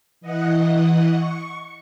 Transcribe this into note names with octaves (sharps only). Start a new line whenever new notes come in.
E3 D#5 F#5
C#6